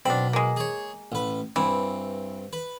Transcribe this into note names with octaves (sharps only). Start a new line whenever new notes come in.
B1 C4 D4 B5
G#3 A#3
G#4 C#5
A1 B4
G2 E3 C4
B4